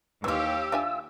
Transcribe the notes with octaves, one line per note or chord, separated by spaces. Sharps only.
D#2 E3 F4 G4 C#5 F5 E6
D4 F4 E5 G#5